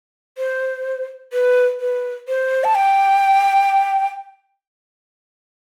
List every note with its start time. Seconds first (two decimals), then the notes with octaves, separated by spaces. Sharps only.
0.38 C5
1.33 B4
1.80 B4
2.28 C5
2.64 A5
2.75 G5